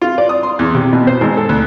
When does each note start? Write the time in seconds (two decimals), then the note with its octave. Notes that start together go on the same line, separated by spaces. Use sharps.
0.02 F4
0.18 D5
0.29 D#6
0.43 C6
0.59 E2
0.75 C3
0.93 B2
1.07 C5
1.21 G#1
1.37 A4
1.49 D2